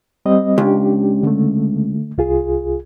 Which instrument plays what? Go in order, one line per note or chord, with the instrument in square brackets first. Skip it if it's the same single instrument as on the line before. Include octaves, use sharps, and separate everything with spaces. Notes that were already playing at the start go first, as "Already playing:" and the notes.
[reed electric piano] G3 C4 D#5
[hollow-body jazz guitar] C#2 [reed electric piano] D4 G4
[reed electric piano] D3 A3
C2 F4 G#4